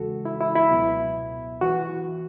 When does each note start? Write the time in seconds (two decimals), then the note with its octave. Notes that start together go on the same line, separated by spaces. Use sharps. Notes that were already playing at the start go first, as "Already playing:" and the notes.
Already playing: E2 C#3 E3 G#3 F#4 A4
0.25 E4
0.41 E4
0.56 E4
0.71 C#2 B2 F#3 B3
1.61 E3 F#4